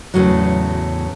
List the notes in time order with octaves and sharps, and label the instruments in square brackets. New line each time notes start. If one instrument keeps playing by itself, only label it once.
[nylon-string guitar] E2 A2 C#3 F#3